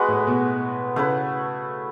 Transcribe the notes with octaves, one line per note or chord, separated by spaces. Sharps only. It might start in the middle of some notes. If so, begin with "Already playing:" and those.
Already playing: G#3 B3 F#4 B4
A2
B2
C#3 A3 E4 B4